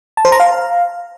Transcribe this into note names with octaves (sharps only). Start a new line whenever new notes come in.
A5
C5
A#5
F5